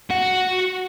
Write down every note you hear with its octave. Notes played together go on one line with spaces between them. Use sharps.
F#4 F#5